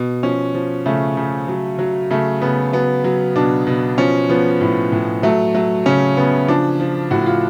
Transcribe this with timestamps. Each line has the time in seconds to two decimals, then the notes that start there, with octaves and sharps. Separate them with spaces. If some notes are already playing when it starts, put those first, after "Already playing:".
Already playing: B2
0.23 F3 C#4
0.54 F3
0.86 C#3 A3
1.17 C#3
1.48 F#3
1.79 F#3
2.10 C#3 A3
2.41 C#3 B3
2.73 F#3 B3
3.04 F#3
3.35 B2 D4
3.67 B2
3.98 F3 C#4
4.29 F3 B3
4.61 A2
4.92 A2
5.23 F#3 A3
5.54 F#3 A3
5.86 C#3 C#4
6.17 C#3 B3
6.48 F3 D4
6.80 F3
7.11 A2 F#4
7.26 F4